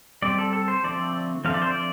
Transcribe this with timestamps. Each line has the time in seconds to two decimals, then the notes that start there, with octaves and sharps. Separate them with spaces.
0.22 G3 C4 D5
0.39 A4
0.53 A4
0.68 C5
0.84 D3 F3 A3 C4 D5
1.45 D3 F3 A3 C4 F5
1.54 D5
1.62 C5
1.70 D5